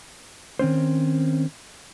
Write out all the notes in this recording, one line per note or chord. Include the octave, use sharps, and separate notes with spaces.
D#3 C4 C#4 C5